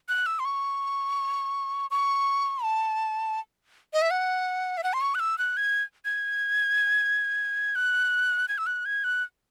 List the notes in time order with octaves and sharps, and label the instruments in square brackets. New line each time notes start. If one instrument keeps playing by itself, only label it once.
[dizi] F#6
E6
C6
C#6
C#6
A5
D#5
E5
F#5
E5
F#5
C6
C#6
F#6
E6
F#6
G#6
G#6
F#6
G#6
E6
F#6
G#6
F#6